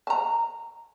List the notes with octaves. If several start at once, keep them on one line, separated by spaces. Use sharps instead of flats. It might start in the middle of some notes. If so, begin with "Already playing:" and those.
A5 A#5